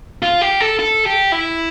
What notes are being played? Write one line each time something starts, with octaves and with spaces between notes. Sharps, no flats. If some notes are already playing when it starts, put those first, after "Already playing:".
F4
G4
A4
A4
G4
E4